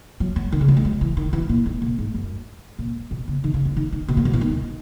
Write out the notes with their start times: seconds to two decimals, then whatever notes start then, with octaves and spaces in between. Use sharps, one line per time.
0.20 F#3
0.36 F#3
0.52 D#3
0.61 C#3
0.68 F#3
0.77 G#3
0.85 F#3
1.01 E3
1.17 D#3
1.33 E3
1.49 A#2
1.66 G#2
1.82 A#2
1.99 G#2
2.15 F#2
2.79 A#2
3.11 B2
3.28 C#3
3.44 D#3
3.54 C#3
3.65 C#3
3.77 D#3
3.92 D#3
4.08 B2
4.17 A#2
4.25 B2
4.33 E3
4.41 D#3